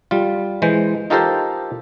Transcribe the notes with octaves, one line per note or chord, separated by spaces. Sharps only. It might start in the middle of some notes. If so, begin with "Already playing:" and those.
G3 F4
E3 G#3 C5
D#4 F4 G4 A4 A#4 C5